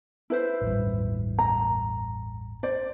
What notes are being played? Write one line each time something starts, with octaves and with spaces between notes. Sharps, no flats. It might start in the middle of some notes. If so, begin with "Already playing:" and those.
E4 B4 C5
A1 E2 G2
A#5
C5 D5